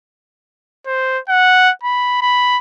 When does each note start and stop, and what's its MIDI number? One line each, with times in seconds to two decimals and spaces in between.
0.87 1.19 72
1.29 1.71 78
1.84 2.21 83
2.21 2.59 83